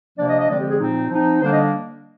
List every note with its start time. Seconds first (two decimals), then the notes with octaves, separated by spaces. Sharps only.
0.18 C3 F3 A#3 D4 D5
0.28 D#5
0.38 D#5
0.49 D3 F3 G#3 C4 D5
0.59 G4
0.70 G#4
0.79 A#2 F3 C4 D#4
1.10 F3 C4 D#4
1.41 D3 G3 A#3 D4 C5
1.51 D#5